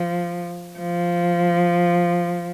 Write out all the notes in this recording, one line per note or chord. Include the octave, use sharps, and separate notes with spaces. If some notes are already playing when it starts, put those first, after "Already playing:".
Already playing: F3
F3